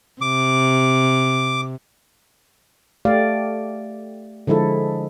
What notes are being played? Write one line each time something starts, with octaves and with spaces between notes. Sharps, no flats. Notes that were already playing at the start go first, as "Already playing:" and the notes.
C3 D6
A3 G4 D5 F5
D3 F3 G#3 E4 A4